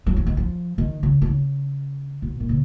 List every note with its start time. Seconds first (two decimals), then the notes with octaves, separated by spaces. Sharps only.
0.06 F#3
0.16 F3
0.26 D#3
0.37 F3
0.78 D#3
1.03 C#3
1.22 B2
1.26 C#3
2.22 B2
2.40 A#2
2.49 C#3